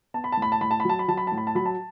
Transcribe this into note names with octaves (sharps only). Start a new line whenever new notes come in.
B3 A5
B5
A5
A2 B5
A5
A2 B5
A5
B5
F#3 A5
B5
F#3 A5
B5
A5
A2
B5
A5
F#3 B5
A5